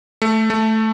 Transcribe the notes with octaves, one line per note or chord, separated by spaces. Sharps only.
A3
A3